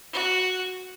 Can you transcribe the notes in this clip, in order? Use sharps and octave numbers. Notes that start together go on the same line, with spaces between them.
F#4